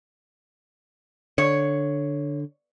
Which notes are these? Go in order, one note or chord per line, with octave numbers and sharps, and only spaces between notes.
D3 C#5